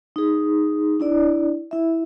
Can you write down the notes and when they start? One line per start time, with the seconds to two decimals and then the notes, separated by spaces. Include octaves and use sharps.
0.16 D#4 G#4
1.00 D4 E4 D5
1.71 E4 E5